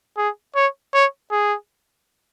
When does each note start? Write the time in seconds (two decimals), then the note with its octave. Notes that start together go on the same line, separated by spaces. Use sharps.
0.17 G#4
0.55 C#5
0.94 C#5
1.32 G#4